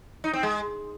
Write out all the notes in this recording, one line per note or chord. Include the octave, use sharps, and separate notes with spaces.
D#4
C4
G#3